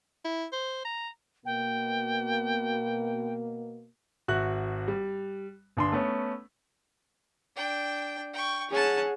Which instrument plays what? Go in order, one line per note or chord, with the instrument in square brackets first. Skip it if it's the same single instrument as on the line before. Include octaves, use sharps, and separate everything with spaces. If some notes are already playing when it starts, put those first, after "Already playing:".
[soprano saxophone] E4
C5
A#5
[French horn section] B2 A#3 [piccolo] G5
[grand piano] G#1 F#4 E5 F#6
G3
G1 D4 C6
A3 B3 C#4
[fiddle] D4 G5
G5 C#6
[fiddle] C#4 A5 [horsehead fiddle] G#4 F#5